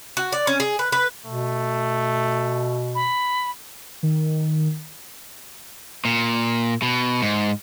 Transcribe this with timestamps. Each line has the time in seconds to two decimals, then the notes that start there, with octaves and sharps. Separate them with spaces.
0.17 F#4
0.32 D5
0.47 C#4
0.60 G#4
0.79 B4
0.92 B4
1.26 B2 A3
2.95 B5
4.03 D#3
6.05 A#2
6.82 B2
7.22 G#2